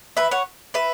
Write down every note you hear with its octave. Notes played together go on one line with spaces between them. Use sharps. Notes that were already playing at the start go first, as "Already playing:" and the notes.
B4 E5
C#5 F#5
B4 E5